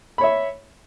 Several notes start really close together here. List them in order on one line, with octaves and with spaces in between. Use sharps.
B5 C#5 E5